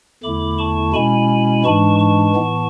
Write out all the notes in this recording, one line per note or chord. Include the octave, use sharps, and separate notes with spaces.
E2 D3 A3 E4 B5 D6
A5 C#6
B2 G#3 C#4 E4 G#5 B5
G#2 E3 G#3 D4 A5 C#6
A5 C#6
A2 E3 B3